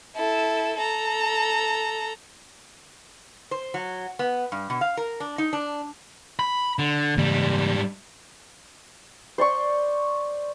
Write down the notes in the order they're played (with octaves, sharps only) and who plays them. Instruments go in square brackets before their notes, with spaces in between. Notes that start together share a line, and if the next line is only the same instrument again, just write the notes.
[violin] E4 A4
A4 A#5
[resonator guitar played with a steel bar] C5
F#3
B3
G2
B2
F5
A#4
D4
D#4
D4
[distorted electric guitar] B5
D3
[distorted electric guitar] G#2 G3 [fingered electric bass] C#3 E3 A#3
[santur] C5 D5 C6 C#6